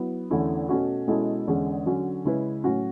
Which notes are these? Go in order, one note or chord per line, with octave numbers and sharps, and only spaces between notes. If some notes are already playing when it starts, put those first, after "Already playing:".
Already playing: F#3 B3 E4
E2 D3 A3 C#4 E4
B2 A3 C#4 F#4
B2 G#3 C#4 E4 A4
E2 D3 G#3 C#4 G#4
D3 F#3 C#4 F#4
C#3 G#3 C#4 E4 B4
A2 F#3 C#4 F#4